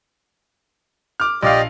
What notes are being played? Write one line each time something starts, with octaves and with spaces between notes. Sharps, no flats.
D6 F6
A#1 G4 D5 D#5 F5